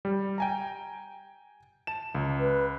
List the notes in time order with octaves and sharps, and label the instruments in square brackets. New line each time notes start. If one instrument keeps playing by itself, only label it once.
[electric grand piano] G3
G5 G#5 A#5
A5 E7
C#2
[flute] B4